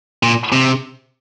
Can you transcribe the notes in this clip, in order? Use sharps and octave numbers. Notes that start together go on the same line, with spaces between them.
A#2
C3